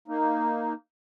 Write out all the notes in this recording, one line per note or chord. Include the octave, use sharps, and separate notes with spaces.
A#3 D#4